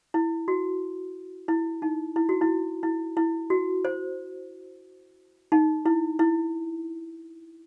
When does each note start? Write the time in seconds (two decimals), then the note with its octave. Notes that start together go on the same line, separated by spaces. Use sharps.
0.14 E4
0.48 F#4
1.48 E4
1.82 D#4
2.16 E4
2.29 F#4
2.41 E4
2.83 E4
3.17 E4
3.50 F#4
3.85 C5
5.52 D#4
5.86 E4
6.19 E4